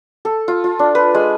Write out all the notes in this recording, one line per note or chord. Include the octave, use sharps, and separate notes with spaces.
A4
F4
F4
D4
B4
G#3